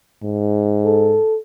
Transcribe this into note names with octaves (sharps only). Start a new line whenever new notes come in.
G#2
A4